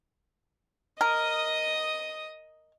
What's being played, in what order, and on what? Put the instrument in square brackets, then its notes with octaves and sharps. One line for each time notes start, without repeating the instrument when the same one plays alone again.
[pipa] A#4 [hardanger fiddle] D#5 D#6